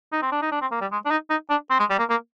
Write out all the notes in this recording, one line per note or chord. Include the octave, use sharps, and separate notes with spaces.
D#4
C4
D4
D#4
D4
C4
A#3
G3
G#3
D4
D#4
D#4
D4
C4
G#3
G3
A#3
A#3